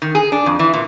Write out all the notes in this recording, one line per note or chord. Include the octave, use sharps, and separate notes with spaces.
D#3
G#4
D4
F2
E3
A#2